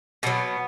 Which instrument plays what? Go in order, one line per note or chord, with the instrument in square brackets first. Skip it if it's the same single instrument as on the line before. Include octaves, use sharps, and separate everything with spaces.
[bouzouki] B2 F#3 B3